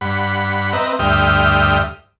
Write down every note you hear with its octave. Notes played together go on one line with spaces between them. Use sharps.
G2 F#5 B5
C4 B4 D#5 E5 A#5
D2 G2 E5 G5 D#6 F6